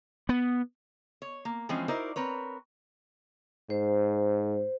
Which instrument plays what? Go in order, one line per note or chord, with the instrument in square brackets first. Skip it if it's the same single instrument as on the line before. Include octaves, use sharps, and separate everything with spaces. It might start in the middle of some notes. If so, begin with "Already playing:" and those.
[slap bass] B3
[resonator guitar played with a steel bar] C#5
A#3
E3 F3 G#3 C4 C#4
D#4 E4 F#4 A#4 C5 D5
C4 A#4 B4 C#5
[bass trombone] G#2 [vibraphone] C5